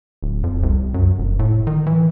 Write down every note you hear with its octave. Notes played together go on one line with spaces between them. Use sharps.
D1
F2
C2
F#2
F1
A2
D#3
E3